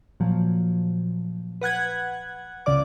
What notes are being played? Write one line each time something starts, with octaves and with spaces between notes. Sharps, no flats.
A#2 F3 F#3
B4 F#5 F#6 G#6
C#2 C#3 C#4 D5 D6